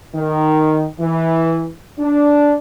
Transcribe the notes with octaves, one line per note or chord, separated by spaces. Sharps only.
D#3
E3
D4